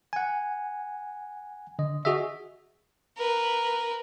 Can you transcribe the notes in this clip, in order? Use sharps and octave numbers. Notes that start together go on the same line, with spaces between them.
F#5 G#5
D3 D#5
F#4 G#4 D#5 E5
A#4 B4